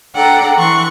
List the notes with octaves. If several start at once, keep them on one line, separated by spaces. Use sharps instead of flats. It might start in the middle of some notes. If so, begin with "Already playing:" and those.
D4 A4 F#5 G5 A#5
E3 C6 C#6 F#6